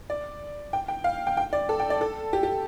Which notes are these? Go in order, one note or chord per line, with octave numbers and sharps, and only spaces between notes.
D5
G5
G5
F5
G5
G5
D5
A4
G5
D5
A4
G4
G4